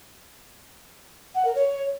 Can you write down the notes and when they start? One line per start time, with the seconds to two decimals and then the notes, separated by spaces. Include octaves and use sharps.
1.35 F#5
1.45 A#4
1.55 C#5